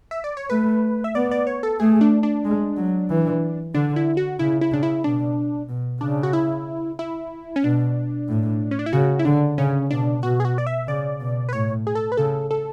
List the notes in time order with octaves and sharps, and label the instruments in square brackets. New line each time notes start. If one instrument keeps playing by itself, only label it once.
[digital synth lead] E5
D5
C#5
[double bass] A3 [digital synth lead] B4
[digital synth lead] E5
[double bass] B3 [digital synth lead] D5
[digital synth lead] D5
C#5
A4
[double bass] A3 [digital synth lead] G#4
[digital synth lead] D4
D4
[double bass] G#3
F#3
E3
[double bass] D3 [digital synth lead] D4
[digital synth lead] E4
F#4
[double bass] C#3 [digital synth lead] E4
[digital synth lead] E4
[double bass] C#3 [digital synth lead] D4
[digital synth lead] E4
[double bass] B2 [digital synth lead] D4
[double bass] B2
[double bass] C#3 [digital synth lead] D4
[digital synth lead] F#4
E4
E4
C#4
[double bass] B2 [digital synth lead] D4
[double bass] A2
[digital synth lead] C#4
D4
E4
[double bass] C#3 [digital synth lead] F#4
[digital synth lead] E4
[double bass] D3 [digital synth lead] D4
[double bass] C#3 [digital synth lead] C#4
[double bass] B2 [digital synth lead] D4
[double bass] B2 [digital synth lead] F#4
[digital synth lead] G#4
F#4
D5
E5
[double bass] C#3 [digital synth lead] D5
[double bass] B2
[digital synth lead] B4
[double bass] A2 [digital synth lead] C#5
[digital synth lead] G#4
A4
B4
[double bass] C#3 [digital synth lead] A4
[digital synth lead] A4